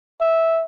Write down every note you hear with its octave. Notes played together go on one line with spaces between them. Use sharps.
E5